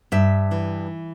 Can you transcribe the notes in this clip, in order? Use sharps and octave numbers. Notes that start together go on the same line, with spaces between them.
G2 E5
E3